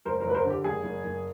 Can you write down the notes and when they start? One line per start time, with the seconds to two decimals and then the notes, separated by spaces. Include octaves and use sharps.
0.05 F#1 A#4 C5
0.20 A#4 C5
0.25 F#1 B4
0.34 A#4 C5
0.45 D3
0.50 G4
0.64 F#1 G#4
0.83 F#1
1.04 F#1